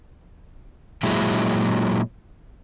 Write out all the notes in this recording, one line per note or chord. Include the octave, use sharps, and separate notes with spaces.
A#2 F#3 G#3 E4